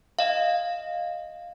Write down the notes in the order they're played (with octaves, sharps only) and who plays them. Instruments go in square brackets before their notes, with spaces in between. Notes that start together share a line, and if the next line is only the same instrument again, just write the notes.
[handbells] D#5 F5